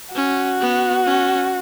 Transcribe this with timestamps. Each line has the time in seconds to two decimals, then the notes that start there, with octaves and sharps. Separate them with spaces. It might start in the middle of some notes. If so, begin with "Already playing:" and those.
0.15 C#4 F#4
0.61 B3
1.06 C#4